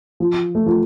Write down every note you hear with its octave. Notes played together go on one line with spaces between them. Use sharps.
F3
A3
F3